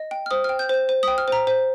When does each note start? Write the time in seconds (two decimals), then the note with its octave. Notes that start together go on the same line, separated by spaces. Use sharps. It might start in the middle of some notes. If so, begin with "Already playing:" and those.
Already playing: D#5
0.11 G5
0.26 F6
0.31 C5 D#6
0.44 G5 F6
0.59 G6
0.69 C5 G6
0.89 C5
1.03 G5 D#6
1.18 F6
1.28 C5 A#5
1.47 C5